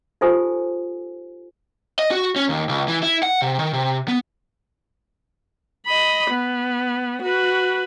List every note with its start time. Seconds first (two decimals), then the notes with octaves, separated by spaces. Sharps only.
0.21 D#4 F4 G4 A4 C5 G#5
1.99 D#5
2.11 F#4
2.36 C#4
2.49 D#2
2.69 C#2
2.88 E3
3.03 E4
3.23 F#5
3.42 C3
3.59 D#3
3.73 C3
4.08 B3
5.86 D#5 B5
6.30 B3
7.22 F#4 B4